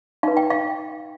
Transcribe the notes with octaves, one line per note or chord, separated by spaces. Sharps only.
D#4 B4 F5
G5
F5